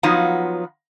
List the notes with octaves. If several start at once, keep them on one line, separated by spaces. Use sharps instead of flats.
F3 F#3 B3 D#4 F4